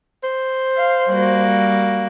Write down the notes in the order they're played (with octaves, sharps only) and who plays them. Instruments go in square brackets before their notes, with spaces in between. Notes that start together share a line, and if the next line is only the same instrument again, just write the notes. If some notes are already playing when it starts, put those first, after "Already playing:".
[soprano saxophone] C5
[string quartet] F5
G3 A#3 F#4